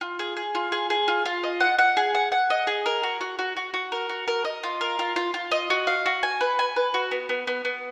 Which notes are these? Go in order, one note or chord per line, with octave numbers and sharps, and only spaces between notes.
F4
G#4
G#4
F4
G#4
G#4
F4
F4
D#5
F#5
F#5
G#4
F#5
F#5
D#5
G#4
A#4
F#4
F#4
F#4
F#4
F#4
A#4
F#4
A#4
D#5
F4
A#4
F4
F4
F4
D#5
F#4
F5
F#4
G#5
B4
G#5
B4
F#4
B3
B3
B3
B3